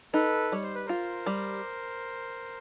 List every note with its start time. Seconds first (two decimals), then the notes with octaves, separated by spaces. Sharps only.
0.14 D#4 A4 B4
0.52 G3 C#5
0.63 C5
0.75 B4
0.86 F4 A#4 C5
1.26 G3